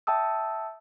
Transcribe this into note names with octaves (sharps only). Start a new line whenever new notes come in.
E5 G5 A5 D#6 E6